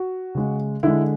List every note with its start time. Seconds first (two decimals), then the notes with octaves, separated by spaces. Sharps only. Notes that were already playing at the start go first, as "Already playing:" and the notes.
Already playing: F#4
0.35 C#3 G#3
0.83 D3 G#3 E4